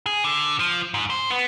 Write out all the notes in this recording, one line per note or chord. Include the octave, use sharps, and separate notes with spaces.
G#4
D3
F3
G#2
C5
B3